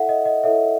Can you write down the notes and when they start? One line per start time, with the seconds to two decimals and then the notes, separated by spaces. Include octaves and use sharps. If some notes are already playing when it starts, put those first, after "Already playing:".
Already playing: E4 A4 C#5 E5 F#5
0.09 D#5
0.25 D#5
0.43 E4 A4 C#5 E5